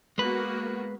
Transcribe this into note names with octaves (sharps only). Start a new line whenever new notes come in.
G#3 A#3 B3 F#4 B4